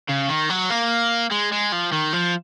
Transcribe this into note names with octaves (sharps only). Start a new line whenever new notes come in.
C#3
D#3
F#3
A#3
G#3
G#3
F3
D#3
F3